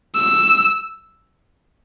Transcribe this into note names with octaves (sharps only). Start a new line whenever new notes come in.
E6